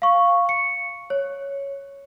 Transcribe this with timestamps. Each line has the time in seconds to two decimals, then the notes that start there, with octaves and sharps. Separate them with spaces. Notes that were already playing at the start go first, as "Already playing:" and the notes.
0.02 F5 C#6
0.49 C#7
1.10 C#5